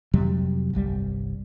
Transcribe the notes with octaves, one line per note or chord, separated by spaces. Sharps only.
F2 C3 F#3 G3
G1 C2 G3